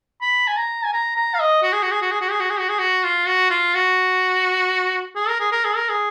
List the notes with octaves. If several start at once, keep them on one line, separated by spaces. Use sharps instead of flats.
B5
G#5
A#5
G#5
A#5
A#5
F5
D#5
F#4
G#4
F#4
G#4
F#4
G#4
F#4
G#4
F#4
G#4
F#4
G#4
F#4
F4
F#4
F4
F#4
G#4
A#4
G#4
A#4
G#4
A#4
G#4